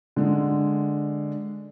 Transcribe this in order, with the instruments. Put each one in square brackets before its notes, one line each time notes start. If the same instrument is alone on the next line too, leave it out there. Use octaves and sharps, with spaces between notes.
[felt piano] D3 G#3